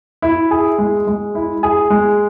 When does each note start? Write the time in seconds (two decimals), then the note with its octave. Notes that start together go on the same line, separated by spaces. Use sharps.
0.22 E4
0.51 G#4
0.78 G#3
1.07 G#3
1.35 E4
1.63 G#4
1.90 G#3